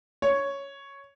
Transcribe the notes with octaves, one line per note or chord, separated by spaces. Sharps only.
C#5